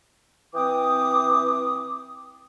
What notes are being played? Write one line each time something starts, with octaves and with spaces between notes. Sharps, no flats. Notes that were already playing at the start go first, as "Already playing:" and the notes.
E3 C4 G5 D6 D#6